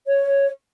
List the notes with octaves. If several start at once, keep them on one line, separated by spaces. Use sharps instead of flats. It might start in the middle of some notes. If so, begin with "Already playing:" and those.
C#5